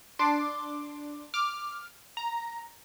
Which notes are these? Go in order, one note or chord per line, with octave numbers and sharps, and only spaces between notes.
D4 C6 D6
D6 F6
A#5